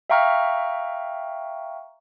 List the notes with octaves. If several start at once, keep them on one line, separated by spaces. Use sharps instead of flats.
E5 F5 G5 A#5 C#6 F6